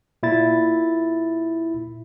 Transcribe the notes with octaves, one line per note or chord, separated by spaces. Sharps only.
A#2 E4 A6